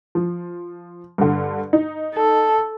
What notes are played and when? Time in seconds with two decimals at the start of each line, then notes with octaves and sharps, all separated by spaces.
0.15 F3
1.18 G2 D3
1.73 D#4
2.15 A4